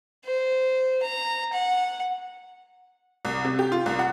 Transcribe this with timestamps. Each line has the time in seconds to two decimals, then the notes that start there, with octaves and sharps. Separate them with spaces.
0.25 C5
1.02 A#5
1.53 F#5
3.25 C2
3.44 C3
3.59 G4
3.72 F4
3.86 C2
3.99 F#5